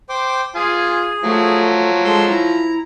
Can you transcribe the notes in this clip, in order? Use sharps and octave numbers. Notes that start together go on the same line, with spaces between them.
C5 G5 D6
F4 G#4 G#5
F3 F#3 A3
G#3 A4 C6 E6
E4 A#5